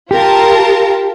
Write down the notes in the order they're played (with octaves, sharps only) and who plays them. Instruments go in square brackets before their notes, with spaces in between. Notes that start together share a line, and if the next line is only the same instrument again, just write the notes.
[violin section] F4 A#4 A5 [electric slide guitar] G4